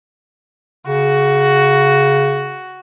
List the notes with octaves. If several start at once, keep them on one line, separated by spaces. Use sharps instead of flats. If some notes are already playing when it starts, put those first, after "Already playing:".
C#3 F#4